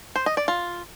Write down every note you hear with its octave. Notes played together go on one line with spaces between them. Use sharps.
C5
D#5
D5
F4